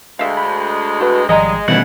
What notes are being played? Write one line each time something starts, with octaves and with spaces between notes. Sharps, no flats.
D2 G3 G#3 E5 F5
B5
E4 F#4 B4
G#1 F3 G3 G#3 D#5 A#5
B2 D#3 E3 G3 A3 C#4 E4 F#5